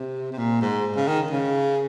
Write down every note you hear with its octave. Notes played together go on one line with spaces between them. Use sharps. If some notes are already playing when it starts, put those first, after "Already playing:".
Already playing: C3
C3
A#2
G#2
C#3
D#3
C#3